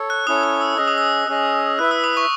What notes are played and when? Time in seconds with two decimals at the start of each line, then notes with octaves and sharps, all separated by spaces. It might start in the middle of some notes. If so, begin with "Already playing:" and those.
Already playing: A4 C#5
0.10 F#6
0.27 C#4 E4 A4 C#5 D#6
0.43 D#6
0.61 E6
0.77 C#4 G#4 D#5 E6
0.87 D#6
0.98 E6
1.28 C#4 G#4 D#5
1.79 E4 B4 E5 F#6
1.91 E6
2.04 D#6
2.17 C#6